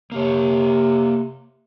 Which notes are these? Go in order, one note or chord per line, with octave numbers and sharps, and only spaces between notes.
C3 A#3 C#5